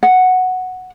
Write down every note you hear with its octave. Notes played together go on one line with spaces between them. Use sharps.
F#5